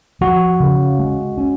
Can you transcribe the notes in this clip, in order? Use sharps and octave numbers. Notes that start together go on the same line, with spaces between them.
F3 F#4
C#3
G#3
C#4